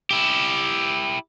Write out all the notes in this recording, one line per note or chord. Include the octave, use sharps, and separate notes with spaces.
E4 G4